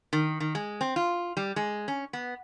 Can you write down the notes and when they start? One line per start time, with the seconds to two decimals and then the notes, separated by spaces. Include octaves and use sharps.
0.13 D#3
0.40 D#3
0.55 G#3
0.81 C4
0.96 F4
1.37 G3
1.56 G#3
1.88 C#4
2.13 B3